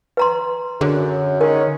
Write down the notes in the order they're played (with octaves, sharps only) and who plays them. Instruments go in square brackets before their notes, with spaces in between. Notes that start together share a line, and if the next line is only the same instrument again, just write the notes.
[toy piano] B4 A#5 C6
[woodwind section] F#2 [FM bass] D3 [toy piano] G#4
[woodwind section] D#3 G#3 C#4 [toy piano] A#4